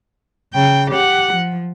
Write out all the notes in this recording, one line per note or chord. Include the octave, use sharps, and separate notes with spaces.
C#3 G5
G4 F#5
F3